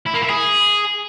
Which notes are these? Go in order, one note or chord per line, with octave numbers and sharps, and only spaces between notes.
E4
A#3
E4
G#4